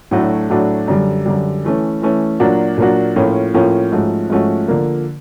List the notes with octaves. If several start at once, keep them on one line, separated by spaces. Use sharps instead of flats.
A2 F#3 A3 D4 F#4
A2 F#3 A3 D4 F#4
F#2 D3 G3
F#2 D3 G3
E3 A3 C#4
E3 A3 C#4
A#2 F#3 A#3 D4 F#4
A#2 F#3 A#3 D4 F#4
A2 F3 A#3 C#4 F4
A2 F3 A#3 C#4 F4
G#2 F3 A3 C#4 F#4
G#2 F3 A3 C#4 F#4
D3 F3 A#3